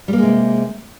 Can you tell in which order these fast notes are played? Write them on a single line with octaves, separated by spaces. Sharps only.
G3 A#3 G#3 C3